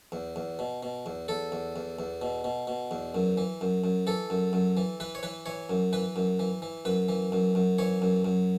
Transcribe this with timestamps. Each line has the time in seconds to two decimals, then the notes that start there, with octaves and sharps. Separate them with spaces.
0.12 E2
0.36 E2
0.59 B2
0.83 B2
1.06 E2
1.28 E2 A4
1.52 E2
1.76 E2
1.99 E2
2.22 B2
2.44 B2
2.67 B2
2.91 E2
3.15 F#2
3.38 E3
3.61 F#2
3.84 F#2
4.07 E3 A4
4.30 F#2
4.53 F#2
4.77 E3
5.00 E3 B4
5.15 C#5
5.23 E3 B4
5.46 E3 C#5
5.69 F#2
5.93 E3 B4
6.16 F#2
6.39 E3
6.62 E3
6.85 F#2 B4
7.09 E3
7.32 F#2
7.55 F#2
7.78 E3 C#5
8.02 F#2
8.25 F#2